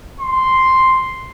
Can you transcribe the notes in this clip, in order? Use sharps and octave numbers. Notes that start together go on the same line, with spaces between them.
C6